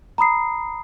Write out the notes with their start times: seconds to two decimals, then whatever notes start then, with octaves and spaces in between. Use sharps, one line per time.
0.18 A#5 B5 D#6 C7